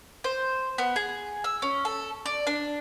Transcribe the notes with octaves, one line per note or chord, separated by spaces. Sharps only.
C5
B3
G#4
E6
C#4
A4
D5
D4